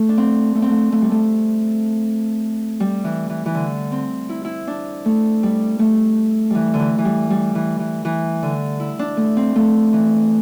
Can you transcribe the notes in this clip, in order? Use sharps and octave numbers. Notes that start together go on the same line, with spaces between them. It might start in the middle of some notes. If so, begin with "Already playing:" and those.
Already playing: A3
D4
C4
A3
C4
A3
A3
G3
A3
G3
E3
E3
E3
D3
C4
E4
E4
D4
A3
G3
A3
E3 G3
D3
E3
E3
G3
G3
E3
E3
E3
D3
E4
D4
A3
C4
A3
E3